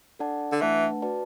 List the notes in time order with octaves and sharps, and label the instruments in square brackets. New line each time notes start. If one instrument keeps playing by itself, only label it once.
[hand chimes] D4 A4 D5 F#5 A5
[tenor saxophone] D3
[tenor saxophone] E3 [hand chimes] A3 D4 B4 F#5 A5
[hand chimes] F#4 B4 D5 A5